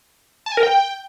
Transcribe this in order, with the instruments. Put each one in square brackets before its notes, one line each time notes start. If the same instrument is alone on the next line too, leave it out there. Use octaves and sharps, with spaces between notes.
[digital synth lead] A5
G#5
A#4
G5